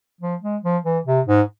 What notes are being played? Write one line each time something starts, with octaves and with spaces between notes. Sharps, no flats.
F3
G#3
F3
E3
C3
G#2